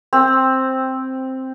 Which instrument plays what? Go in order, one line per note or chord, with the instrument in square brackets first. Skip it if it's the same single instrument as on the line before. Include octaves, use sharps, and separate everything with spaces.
[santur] C4